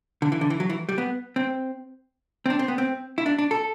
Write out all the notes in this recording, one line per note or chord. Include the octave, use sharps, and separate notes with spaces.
D3
E3
D3
E3
F#3
E3
G3
B3
C4
C4
D4
C4
B3
C4
E4
D4
D4
A4